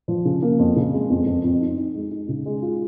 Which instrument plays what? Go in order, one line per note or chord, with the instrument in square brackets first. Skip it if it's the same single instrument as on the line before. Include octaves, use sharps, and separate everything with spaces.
[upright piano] F3
C#3
A#3
F2
C#3
G#3
F2
F2
F2
D#4
D#4
G#3
D#4
C#3
G#3
F4